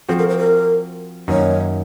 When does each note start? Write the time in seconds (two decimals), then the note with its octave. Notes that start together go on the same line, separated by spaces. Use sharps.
0.09 F3 C4 F#4 A4
0.19 A#4
0.29 C5
0.38 A#4
1.28 F#2 D#3 A#3 D#4 C#5